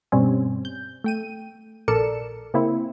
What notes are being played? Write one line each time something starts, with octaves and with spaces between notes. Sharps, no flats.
G2 B2 G3 C4 C#4
G6
A3 G5 D#7
A#1 A4 A#4 D5 C#7 E7
C#3 A#3 C4 E4